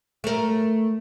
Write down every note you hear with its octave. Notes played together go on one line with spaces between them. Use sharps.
A3 A#4